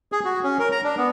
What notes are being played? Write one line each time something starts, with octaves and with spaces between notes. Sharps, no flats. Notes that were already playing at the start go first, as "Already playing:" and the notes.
G#4
F#4
C#4
A#4
A#5
D4
B3